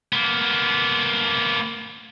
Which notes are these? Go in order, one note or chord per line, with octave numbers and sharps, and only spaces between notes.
A#3 B3